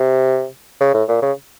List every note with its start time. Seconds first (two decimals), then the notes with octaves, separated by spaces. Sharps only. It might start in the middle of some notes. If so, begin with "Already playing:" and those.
Already playing: C3
0.81 C#3
0.94 A2
1.09 A#2
1.22 C#3